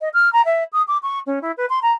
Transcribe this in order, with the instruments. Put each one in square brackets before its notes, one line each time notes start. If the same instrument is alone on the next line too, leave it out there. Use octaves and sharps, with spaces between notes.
[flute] D#5
F6
A#5
E5
D#6
D6
C#6
C#4
E4
B4
C6
A#5